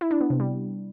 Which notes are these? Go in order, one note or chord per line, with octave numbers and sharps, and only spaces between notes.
E4
D4
B3
C3
G3